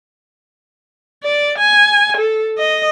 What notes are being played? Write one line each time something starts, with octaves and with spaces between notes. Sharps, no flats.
D5
G#5
A4
D#5